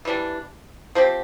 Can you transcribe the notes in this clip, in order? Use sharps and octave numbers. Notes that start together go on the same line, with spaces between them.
E3 G3 D4
F3 C4 G4